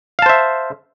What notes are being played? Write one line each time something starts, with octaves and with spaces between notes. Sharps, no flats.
C5 E5 F5 A5